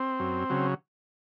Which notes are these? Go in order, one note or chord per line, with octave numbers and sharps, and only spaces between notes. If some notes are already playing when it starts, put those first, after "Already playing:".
Already playing: C4
F#2
C#3 F#3